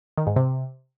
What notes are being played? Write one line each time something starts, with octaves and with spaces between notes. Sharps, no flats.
D#3
G#2
C3